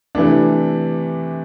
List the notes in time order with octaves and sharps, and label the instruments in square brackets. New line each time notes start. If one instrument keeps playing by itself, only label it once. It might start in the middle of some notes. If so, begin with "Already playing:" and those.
[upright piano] C3 E3 A3 D4